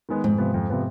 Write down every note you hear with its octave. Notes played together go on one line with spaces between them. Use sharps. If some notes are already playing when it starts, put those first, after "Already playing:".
D#3 G#3 B3
F2 G#2
C3 F3 B3
F2
C3 F3 B3